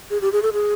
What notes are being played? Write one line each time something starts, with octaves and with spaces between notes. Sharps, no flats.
G#4
G4
G#4
A4
G#4